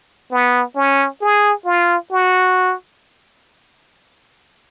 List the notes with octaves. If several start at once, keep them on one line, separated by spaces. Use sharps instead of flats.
B3
C#4
G#4
F4
F#4